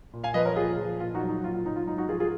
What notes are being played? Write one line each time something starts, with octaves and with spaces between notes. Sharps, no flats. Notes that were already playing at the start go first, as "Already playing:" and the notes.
A#2
F5 G#5
F3 B4 D#5
A#4 C#5
A#2 F4 G#4
F3
A#2 F4
D#4 F#4
F#3
D#4
A#2 F4
F4
F#3 D#4
F4
G#2 D#4
D#4 F#4
F3 F4 G#4
F4 G#4